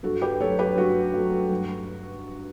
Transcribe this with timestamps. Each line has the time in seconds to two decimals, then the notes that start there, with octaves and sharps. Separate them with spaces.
0.03 G2 F#4 A4
0.22 G4 B4
0.40 F#3 A3 A4 C#5
0.59 G4 B4
0.77 G2 F#4
1.13 F#3 A3
1.51 G2